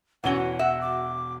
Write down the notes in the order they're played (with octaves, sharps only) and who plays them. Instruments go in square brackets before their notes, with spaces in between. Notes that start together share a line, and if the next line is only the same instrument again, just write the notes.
[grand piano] E1 G7 [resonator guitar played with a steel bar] E3 C#4 F#4 [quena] F#5
[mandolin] F#4 [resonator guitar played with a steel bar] E5
[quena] D6